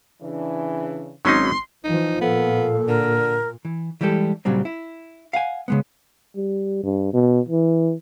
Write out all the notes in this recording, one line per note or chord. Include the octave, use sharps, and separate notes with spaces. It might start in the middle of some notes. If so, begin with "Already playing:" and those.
C#3 E3 D4
G#1 F#3 C#4 D#4 C6
E3 F3 D#4
A#2 B3 A4 F5
D3 A#4
E3
E3 G3 G#3 G4 A4
A#2 C#3 F#3 G3 C4
E4
F5 F#5 G#5
C#3 G#3 B3
G3
G2
B2
E3